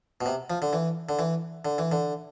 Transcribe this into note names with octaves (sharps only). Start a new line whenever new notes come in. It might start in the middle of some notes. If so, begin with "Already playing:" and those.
B2
C3
F3
D3
E3
D3
E3
D3
E3
D3